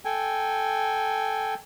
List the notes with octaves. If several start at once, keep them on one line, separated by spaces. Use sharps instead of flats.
A4 G5 G#5